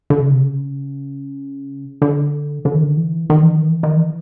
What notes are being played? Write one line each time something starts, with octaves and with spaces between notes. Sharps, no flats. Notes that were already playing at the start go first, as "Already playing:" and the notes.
D3
C#3
C3
C#3
D3
D3
D#3
D3
E3
D#3
E3
D#3
E3
D#3
E3